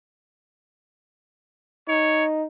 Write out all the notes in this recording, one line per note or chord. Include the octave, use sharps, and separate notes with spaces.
D#4 C#5